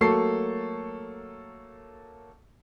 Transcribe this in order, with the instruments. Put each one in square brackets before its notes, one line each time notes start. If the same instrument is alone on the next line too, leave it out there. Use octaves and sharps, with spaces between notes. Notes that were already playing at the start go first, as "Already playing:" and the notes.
[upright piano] F#3 A3 A#3 A4 C#6 C7